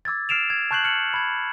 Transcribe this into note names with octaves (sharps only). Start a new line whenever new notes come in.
D6 E6 G#6 A6
F6 C7 D7 E7 F7
G#6
A5 C#6 F#6 G6 C7 F#7
F6 C#7 F#7
B5 G#6